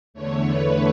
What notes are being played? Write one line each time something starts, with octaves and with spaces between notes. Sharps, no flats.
E2 D3 A3 C#5
B4